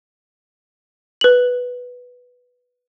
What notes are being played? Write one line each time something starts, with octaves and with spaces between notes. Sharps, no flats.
B4 F#7